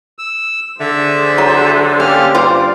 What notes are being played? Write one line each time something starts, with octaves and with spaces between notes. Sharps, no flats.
E6
D3 G#4 C5 E5
F#3
A#3 C#4 G4 F6
G2 F4 G4 C5 D5